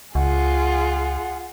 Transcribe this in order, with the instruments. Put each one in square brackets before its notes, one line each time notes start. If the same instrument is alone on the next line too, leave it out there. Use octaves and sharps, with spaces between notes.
[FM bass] C#2 [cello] F4 G#4 [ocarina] F#5